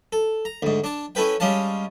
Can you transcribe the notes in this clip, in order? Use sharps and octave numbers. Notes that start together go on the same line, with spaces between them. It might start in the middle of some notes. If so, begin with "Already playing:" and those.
A4
A#5
D2 G#2
D4 A5
C#4 E4 A4 B4 G5
G3 G#3 C#4 F5 A5